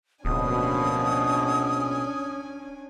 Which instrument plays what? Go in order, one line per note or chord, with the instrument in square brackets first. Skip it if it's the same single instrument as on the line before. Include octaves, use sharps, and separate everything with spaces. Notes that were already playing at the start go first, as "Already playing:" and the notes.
[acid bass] D1 [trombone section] A#1 B2 [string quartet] C#4 D4 G#5 [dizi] D#6